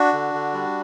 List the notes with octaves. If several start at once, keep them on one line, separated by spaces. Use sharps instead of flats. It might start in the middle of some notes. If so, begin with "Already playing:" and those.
Already playing: D4 F#4
D3
D3
G3